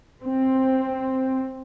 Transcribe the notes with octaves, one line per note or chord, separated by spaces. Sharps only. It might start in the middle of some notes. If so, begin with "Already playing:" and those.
C4